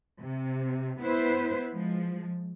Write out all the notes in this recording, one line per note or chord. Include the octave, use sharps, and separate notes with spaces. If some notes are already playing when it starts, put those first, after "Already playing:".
C3
B3 E4 B4 C5
F3 G#3